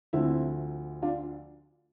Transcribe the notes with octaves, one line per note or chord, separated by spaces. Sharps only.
D2 D3 F3 A3 C4 E4
D4 F4